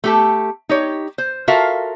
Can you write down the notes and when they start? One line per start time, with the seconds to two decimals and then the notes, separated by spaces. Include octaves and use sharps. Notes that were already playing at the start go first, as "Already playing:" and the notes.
0.04 A3 G4 A4
0.69 D#4 G4 C#5
1.18 C5
1.48 F4 F#4 A4 A#4 E5 F5